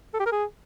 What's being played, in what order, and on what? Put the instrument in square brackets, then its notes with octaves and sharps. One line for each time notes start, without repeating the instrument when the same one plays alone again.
[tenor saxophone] A4
G4
A#4
G#4